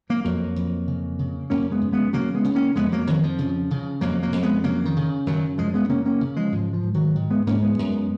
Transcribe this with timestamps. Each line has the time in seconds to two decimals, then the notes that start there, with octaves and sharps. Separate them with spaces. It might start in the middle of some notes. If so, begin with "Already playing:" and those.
0.10 F#3 A#3
0.24 F2 F#3 A#3
0.56 F2
0.87 C#3
1.19 C#3
1.50 F#2 A#3 C#4
1.71 G#3 B3
1.82 F#2
1.93 G#3 B3
2.13 C#3 F#3 A#3
2.34 G#3 B3
2.44 C#3
2.55 A#3 C#4
2.76 F2 G#3 B3
2.92 F#3 A#3
3.07 F2 D#3 F#3
3.23 F3
3.39 C#3
3.71 C#3
4.01 F2 F#3 A#3
4.23 F#3 A#3
4.32 F2
4.43 G#3 B3
4.64 C#3 F#3 A#3
4.85 D#3
4.96 C#3
5.26 F#2 D#3 F#3
5.58 F#2 F3 G#3
5.74 G#3 B3
5.89 C#3 A#3 C#4
6.06 A#3 C#4
6.21 C#3
6.36 F3 G#3
6.52 G#2 F3
6.73 F3
6.83 G#2
6.94 D#3 F#3
7.16 G#2 D#3
7.30 G#3 B3
7.47 G#2 A#3 C#4
7.63 G#3 B3
7.79 F#2